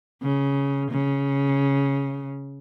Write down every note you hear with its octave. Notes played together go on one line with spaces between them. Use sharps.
C#3
C#3